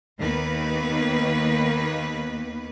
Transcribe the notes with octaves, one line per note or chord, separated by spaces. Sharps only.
D#2 D#3 A#3 B3 B4